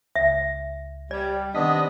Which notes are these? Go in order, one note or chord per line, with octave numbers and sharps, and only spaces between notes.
C#2 E5
G3 D5
C3 D#3 B3 D4 D#5 D#6 B6